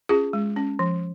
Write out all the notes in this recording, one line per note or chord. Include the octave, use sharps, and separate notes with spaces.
C#4 F4 G#4
G#3
C#4
F3